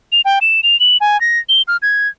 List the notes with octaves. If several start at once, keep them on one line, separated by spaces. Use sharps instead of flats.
F7
G5
E7
F7
F#7
G#5
A#6
G7
F6
G#6